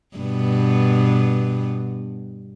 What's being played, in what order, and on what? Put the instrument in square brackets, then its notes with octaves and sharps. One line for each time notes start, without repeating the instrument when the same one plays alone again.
[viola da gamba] G2 B2 B3